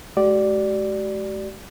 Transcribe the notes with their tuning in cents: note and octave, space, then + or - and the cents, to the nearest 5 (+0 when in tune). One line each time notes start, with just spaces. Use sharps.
G#3 +45 G4 -45 D5 +0